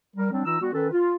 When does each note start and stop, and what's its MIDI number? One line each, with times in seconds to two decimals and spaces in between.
0.16 0.30 55
0.16 0.30 70
0.31 0.41 54
0.31 0.41 55
0.31 0.41 60
0.31 0.41 62
0.45 0.57 52
0.45 0.57 63
0.45 0.57 65
0.45 0.57 82
0.45 0.57 88
0.60 0.72 55
0.60 0.72 59
0.60 0.72 66
0.73 0.86 51
0.73 0.86 61
0.73 0.86 69
0.73 0.86 71
0.90 1.15 65